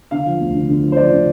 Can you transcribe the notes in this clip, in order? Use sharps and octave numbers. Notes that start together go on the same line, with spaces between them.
D3 F5
F3
D2
D3
D3
F3
C5
F3 D5
D3